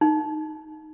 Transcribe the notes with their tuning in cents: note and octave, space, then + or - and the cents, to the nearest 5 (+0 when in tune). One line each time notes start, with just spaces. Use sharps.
D#4 -15